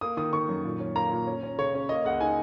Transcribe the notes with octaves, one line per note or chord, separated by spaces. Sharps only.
A#3 D#6
D#3 D#6
D#3 C#6
F#2
A#2
C#4
A#3 A#5
A#2
C#4
C#4
C#3 C#5
C#4
A#3 D#5
C#2 F#5
D#4 G#5